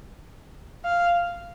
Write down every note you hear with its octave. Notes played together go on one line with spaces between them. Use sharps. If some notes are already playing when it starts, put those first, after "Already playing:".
F5